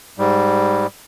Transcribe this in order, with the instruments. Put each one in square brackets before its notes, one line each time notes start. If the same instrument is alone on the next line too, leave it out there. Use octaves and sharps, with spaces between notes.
[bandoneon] G#2 G3